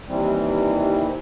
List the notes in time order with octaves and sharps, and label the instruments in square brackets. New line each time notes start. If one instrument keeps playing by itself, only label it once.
[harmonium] D#2 C3 E3 G3 C4